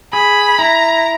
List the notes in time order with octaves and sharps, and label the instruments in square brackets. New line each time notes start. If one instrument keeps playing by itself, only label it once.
[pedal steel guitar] G#4 [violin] B5
[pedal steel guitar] E4 [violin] A#5